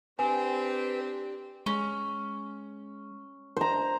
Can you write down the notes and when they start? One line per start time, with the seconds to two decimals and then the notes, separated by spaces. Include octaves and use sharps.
0.19 C4 D4 G4 B4 G#5
1.66 G#3 C#4
3.56 C5 A#5